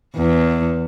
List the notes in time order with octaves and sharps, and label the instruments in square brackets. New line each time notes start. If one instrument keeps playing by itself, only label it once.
[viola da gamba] E2